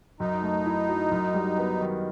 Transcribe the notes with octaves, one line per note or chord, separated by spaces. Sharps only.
F#2 D#4
A3
E4
F#3
F#2
G3
B3
D#3